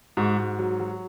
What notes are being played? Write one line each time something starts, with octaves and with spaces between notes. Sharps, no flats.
G#2 F#4
G#2
F#3
F#3